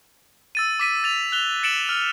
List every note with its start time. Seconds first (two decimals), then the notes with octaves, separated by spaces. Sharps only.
0.55 E6 A6 D#7
0.80 D6 B6 D#7
1.04 A6 F7
1.32 F#6 F7 G7
1.63 A6 C#7 D7 E7 F#7
1.89 F6